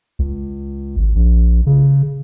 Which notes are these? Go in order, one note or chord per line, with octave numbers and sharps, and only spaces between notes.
C#2
G#1
A#1
C#3